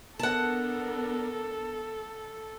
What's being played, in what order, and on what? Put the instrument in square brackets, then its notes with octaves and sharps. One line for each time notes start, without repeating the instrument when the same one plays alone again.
[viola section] B3 D4 A#4 [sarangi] A4 [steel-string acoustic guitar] F#5 A5